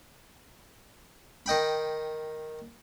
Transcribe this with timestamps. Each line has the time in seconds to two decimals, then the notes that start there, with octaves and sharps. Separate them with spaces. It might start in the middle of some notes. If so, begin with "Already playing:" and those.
1.46 D#3 D#5 G5 B5